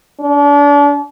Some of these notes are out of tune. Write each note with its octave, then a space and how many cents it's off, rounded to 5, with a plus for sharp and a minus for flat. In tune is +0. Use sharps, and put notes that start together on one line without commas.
D4 -35